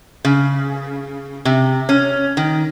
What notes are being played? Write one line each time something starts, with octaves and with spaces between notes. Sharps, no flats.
C#3
C3
C#4
D#3